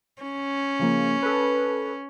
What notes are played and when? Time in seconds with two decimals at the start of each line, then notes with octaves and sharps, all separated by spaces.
0.22 C#4
0.79 C#3 F3 A#3
1.22 A4 B4